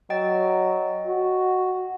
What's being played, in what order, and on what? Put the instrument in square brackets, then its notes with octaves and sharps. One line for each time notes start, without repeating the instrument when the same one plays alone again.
[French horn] F#3 [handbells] D#5 G5 A6
[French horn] F#4